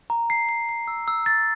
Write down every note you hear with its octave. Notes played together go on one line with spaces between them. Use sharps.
A#5
C7
C7
C7
E6
E6
A6